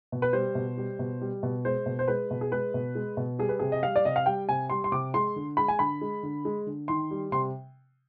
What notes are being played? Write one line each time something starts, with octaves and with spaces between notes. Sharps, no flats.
B2
B4
G3 C5
B2
G3
B2
G3
B2
G#3 C5
B2
C5
G#3 B4
B2
G#4
G#3 B4
B2
G#3
B2
G3 G#4
B4
C3 G#4
D#5
G3 F5
D5
C3 D#5
F5
G3 G5
C3 G#5
G3 C6
C6
C3 D6
G#3 C6
D3
G#3 B5
G#5
D3 B5
G#3
D3
G#3
D3
D#3 C6
G3
C3 C6